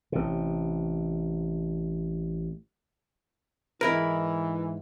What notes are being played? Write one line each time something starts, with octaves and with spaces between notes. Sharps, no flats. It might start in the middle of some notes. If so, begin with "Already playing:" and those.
A1 C3
G#2 E3 E4 A#4 B4